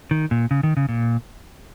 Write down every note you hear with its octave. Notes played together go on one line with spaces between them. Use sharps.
D#3
A#2
C#3
D#3
C#3
A#2